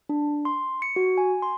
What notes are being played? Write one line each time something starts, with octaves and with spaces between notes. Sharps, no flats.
D4
C6
C#7
F#4
G#5
C6